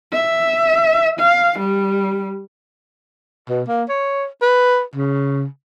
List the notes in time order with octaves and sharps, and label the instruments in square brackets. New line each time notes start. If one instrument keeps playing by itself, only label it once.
[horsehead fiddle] E5
F5
G3
[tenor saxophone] B2
A#3
C#5
B4
C#3